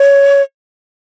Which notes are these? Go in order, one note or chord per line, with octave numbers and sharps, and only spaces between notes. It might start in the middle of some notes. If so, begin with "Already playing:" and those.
Already playing: C#5